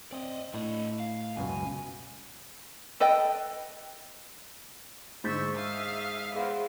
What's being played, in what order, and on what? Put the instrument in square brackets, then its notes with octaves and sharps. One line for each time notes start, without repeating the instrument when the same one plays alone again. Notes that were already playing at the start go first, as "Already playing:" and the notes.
[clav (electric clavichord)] C4 [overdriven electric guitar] D5 D#5
[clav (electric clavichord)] A2 [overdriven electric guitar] E4 D#5
[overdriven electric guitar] F5
[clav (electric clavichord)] C#2 F#2 B2 [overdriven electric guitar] G#5
[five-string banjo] A4 B4 D#5 G5
[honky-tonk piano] G#2 G6 [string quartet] D3 C#6 E6 [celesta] C5 A6 B6
[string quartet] E5 F5 D#6
[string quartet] E2 C5 [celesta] G#4 F5 F#5